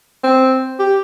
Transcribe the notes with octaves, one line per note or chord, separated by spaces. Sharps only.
C4
G4